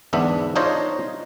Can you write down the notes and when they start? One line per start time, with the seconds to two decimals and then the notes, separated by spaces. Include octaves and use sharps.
0.13 G1 E2 G#2 B3 D4 E5
0.56 D4 D#4 F4 C5 C#5 D#5